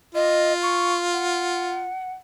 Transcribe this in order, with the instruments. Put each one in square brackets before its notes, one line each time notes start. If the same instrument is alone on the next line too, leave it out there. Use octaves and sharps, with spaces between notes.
[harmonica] F4 [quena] D#5
[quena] C#6
F#5